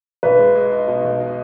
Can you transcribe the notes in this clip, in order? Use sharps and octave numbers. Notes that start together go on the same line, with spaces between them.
B1 B4
G#3
G#3
D#4
B2
B1
D#4